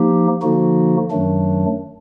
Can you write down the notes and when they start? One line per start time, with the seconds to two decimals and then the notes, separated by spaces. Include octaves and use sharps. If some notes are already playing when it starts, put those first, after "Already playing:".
Already playing: F3 A#3 D#4 G4
0.42 D3 F3 A#3 D#4 F#4
1.10 F#2 D#3 F#3 A3 D4